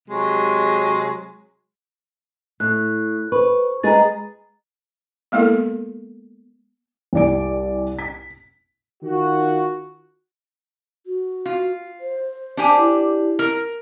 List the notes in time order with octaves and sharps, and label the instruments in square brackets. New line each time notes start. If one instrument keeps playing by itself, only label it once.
[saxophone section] C3 F#3 G#3
[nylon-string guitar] A2 [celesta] F#6
[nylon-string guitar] B4 [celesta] C5 C#6
[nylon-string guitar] G#3 G#4 B4 [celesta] A#5 A6
[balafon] G#3 A#3 B3 E4 A4 A#4
[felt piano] C2 G3 E4 D5 G#5 D7
B6
[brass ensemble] D#3 F4 F#4
[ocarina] F#4
[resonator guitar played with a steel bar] F4
[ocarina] C5
[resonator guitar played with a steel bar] D4 G4 G#5
[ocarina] E4
[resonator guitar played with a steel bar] A#4